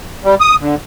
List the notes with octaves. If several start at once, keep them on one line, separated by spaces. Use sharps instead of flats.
G3
D#6
D3